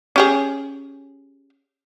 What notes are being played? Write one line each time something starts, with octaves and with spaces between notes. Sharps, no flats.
C#4 G4 G#4